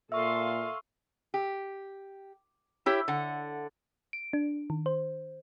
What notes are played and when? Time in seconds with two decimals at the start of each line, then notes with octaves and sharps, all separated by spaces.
0.12 A#2 A4 E5 F5 C6 C#6 E6
1.34 G4
2.86 E4 G4 C#5
3.08 D3 F#5
4.13 D7
4.33 D4
4.70 D#3
4.86 C5